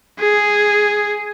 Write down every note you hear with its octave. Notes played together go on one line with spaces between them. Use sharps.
G#4